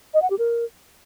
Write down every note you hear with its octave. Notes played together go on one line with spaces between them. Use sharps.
D#5
F#5
G4
A#4